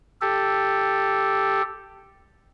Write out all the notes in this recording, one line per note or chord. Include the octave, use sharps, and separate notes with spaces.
G4 A4